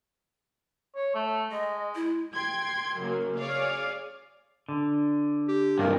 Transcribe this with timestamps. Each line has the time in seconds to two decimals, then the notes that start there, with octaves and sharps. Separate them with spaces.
0.96 C#5
1.15 A3
1.51 G#3 D#5
1.95 E4
2.34 G5 C6 G#6
2.99 F#2 C#3 F#3 A#3
3.37 G#4 C#5 D5 F5
4.69 D3
5.48 G4
5.79 B1 G2 A#4